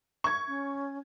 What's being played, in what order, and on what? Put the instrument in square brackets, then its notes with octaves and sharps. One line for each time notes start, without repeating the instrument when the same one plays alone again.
[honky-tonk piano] C#6 G#6
[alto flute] C#4